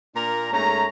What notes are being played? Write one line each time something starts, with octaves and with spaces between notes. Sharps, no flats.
A#2 D4 A#4 A#5
G#2 A3 C#4 A#5